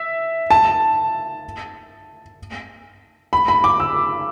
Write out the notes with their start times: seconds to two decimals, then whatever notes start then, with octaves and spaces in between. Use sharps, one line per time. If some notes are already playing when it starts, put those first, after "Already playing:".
Already playing: E5
0.51 A5
3.33 B5
3.48 B5
3.64 D6
3.80 E6